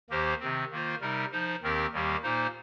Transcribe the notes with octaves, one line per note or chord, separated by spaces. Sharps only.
D#2 D#3 A#3 G4 C5
C3 D#3 C4
D#3 A#3 F4 C5
C3 G3 D#4 A#4
F3 D#4 C5
D#2 D#3 C4 G4 A#4
D#2 D#3 G3 A#3 G4
A#2 A#3 D#4 C5